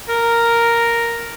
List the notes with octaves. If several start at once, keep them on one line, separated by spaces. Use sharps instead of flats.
A#4